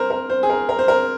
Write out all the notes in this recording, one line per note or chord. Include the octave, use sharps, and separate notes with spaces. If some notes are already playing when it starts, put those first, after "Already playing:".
Already playing: A#4 C5
A#4
C5
G#4
A#4
A#4
C5
A#4